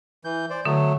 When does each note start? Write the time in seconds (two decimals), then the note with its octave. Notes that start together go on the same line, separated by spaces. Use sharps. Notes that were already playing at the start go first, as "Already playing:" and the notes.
0.24 E3 G6
0.50 C5 D5
0.65 D3 F#3 A3